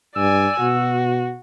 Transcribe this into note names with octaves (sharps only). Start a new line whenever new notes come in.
G2 D5 G#5 E6
B2 F#4